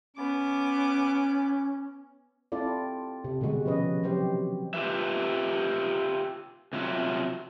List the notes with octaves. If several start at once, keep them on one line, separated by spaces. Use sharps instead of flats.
B3 C#4 D6
C4 E4 F4 A4 D5
C3
B2 D3 G3 G#3 F#4
F3 C#4 B4 D#5
E3 F#3 C4 G4 C5
F4 G4 B4 E5
C3 F#3 F4 E5